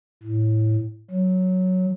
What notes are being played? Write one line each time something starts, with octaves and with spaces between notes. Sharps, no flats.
A2
F#3